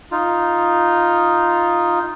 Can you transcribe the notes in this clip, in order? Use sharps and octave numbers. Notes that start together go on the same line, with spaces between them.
D#4 F4